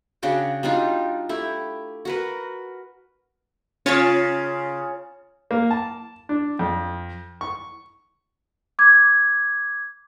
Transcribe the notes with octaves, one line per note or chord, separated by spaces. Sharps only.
C#3 D4 F#4 G5
G3 D4 D#4 F4
A3 E4 G4
F#4 A#4 B4
C#3 C#4 F4 C#5 A6
A#3
A5
D4
F2
C#6
D6 G#6